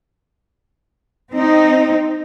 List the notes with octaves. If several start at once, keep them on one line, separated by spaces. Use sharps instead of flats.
C4 D#4